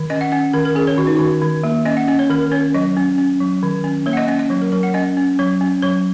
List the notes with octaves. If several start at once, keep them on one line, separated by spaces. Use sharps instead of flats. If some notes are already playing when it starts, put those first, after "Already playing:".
Already playing: D#3
C#4 D#5
F#5
C#4 F#5
D#3 A#4
A#4
C#4 G#4
C#5
D#3 F#4
D#4
D#3 F#4
D#3
A#3
C#4 D#5
F#5
C#4 D#5
C#5
D#3 A#4
C#4 C#5
F#3 D#5
C#4
C#4
F#3
D#3
C#4
A#3 C#5
F#5
D#5
C#4 D#5
D#5
F#3 C#5
A#4
F#3 A#4
F#5
C#4 D#5
C#4
F#3 C#5
C#4
F#3 C#5